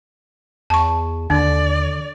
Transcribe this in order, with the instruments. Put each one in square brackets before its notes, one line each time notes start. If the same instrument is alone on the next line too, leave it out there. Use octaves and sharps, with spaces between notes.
[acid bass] E2 [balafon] A5 C#6
[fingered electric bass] D#2 [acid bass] D3 [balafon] D4 [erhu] D5